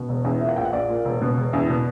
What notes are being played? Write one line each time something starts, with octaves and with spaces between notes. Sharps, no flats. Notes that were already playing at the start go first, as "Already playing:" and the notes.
Already playing: B2
E1
E2
A#2 E5
F#5
A#1 G5
F#5
A#1 D5
A#2
E1
B2
E1
E2
B2